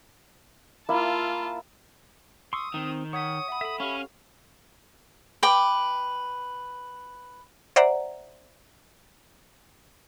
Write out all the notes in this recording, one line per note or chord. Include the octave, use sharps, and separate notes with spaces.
A#3 E4 F4 E5 A5
C6 C#6 D#6 E6
D#3 C4 D#4
C#5 F#5 D#6 G#6 B6
E5 F#5 B5
A4 E5 B5
C#4 G4 F5 C#6
B4 G5 D6
C5 D5 E5 F#5 A#5